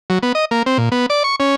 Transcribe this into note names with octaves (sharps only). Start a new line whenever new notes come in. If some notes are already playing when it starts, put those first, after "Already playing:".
F#3
B3
D#5
A#3
C4
A#2
B3
D5
C#6
C#4